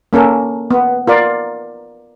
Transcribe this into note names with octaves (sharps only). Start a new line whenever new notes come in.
A#3 C#4 A4 A#4
B3
F4 A#4 D5